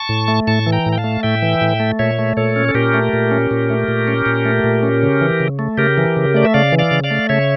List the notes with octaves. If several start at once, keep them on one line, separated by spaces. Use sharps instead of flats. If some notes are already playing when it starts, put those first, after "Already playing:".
Already playing: A5 C#6
A2
A3
A2 A5 C#6
E3
G5 A#5
A2
G5
F5 A5
A3
A2 E5 G5
E3
A2
A3
A#2 C#5 E5
A3
A#2 A4 C#5
C#4
A4
A#2 G4 A#4
A3
A#2
C#4
A#2
A3
A#2
C#4
A#2
A3
A#2
C#4
C#3
E3
C#3
A3
C#3 G4 A#4
E3
C#3
A3 D5
E5
C#3 D5 F5
E3
D5 F5
C#3
D5 F5
A3
C#3 C#5 E5